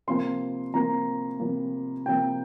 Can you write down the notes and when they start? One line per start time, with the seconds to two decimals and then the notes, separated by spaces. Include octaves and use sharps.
0.07 C3 F3 A#3 C6
0.73 C3 F3 A#3 A#5
1.40 C3 F3 A#3
2.06 C3 F3 A#3 G5